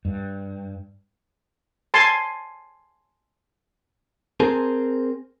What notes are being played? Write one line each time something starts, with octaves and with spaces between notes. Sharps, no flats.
G2
G#5 A5 C6
C4 G#4 A#4 C5 G#5 A5